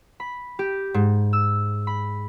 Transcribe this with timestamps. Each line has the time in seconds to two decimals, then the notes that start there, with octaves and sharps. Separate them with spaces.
0.20 B5
0.59 G4
0.94 G#2
1.33 E6
1.87 B5